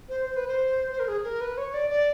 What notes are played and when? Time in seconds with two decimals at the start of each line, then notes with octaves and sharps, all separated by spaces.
0.09 C5
0.25 C5
0.36 B4
0.47 C5
0.91 C5
1.00 A#4
1.08 G#4
1.24 A#4
1.41 B4
1.57 C#5
1.74 D5
1.90 D5